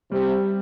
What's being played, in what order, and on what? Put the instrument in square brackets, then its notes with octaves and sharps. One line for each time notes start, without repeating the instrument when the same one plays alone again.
[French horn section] C3 [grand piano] G3